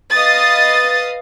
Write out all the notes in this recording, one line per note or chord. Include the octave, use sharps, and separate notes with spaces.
B4 D#5 F5 D#6 A6